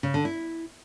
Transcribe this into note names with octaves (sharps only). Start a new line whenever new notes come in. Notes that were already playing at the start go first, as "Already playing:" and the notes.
C#3
D3
E4